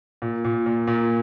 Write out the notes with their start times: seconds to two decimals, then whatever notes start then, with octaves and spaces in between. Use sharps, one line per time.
0.22 A#2
0.44 A#2
0.66 A#2
0.87 A#2